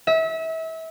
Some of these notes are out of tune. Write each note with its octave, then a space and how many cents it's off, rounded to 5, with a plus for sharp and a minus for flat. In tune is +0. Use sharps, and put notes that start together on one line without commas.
E5 -30